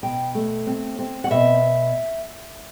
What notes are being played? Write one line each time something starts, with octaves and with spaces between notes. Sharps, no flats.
B2 G5
A3
C4
C4
F#5
B2 E5